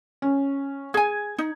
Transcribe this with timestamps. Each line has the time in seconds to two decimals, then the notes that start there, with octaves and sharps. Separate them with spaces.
0.22 C#4
0.94 G#4 G#5 G#6
1.38 D#4